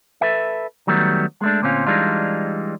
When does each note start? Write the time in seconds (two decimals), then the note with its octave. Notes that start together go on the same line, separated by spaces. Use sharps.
0.21 A4 B4 E5
0.87 D#3 F#3 G3 A3 B3
1.41 G#3 A3 D4
1.62 D2 A#2 C4 C#4 F4
1.87 E3 G3 G#3 D4 D#4 F4